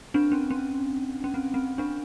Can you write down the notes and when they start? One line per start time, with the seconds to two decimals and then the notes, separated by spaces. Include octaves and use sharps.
0.14 C4 D4
0.32 C#4
0.50 C#4
1.24 C#4
1.34 C4
1.54 C4
1.78 C4 D4